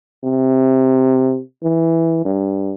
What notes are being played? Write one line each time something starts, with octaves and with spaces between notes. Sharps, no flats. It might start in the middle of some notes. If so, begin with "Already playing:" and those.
C3
E3
G2